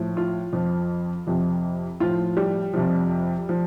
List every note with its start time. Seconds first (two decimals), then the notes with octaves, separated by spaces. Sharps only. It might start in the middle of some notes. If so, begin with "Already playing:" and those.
Already playing: A2 F3
0.17 F4
0.53 F2 F3
1.27 F2 C3 F3
2.00 A2 F3 F4
2.37 G3
2.73 F2 C3 F3
3.49 F3